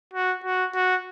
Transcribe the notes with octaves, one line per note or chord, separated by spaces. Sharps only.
F#4
F#4
F#4